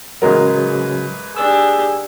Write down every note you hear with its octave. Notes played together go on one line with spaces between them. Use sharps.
A1 C#3 F#3 G#3 A#4 B4
D4 G4 G#4 E6